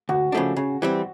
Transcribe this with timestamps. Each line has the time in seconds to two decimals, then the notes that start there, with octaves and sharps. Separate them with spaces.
0.09 D2 F#4
0.32 C#3 F3 A3 D4
0.56 C#3
0.82 E3 G3 C4